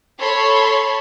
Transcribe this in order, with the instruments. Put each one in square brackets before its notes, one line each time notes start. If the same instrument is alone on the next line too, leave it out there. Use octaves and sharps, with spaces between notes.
[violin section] A4 C#5 B5 C6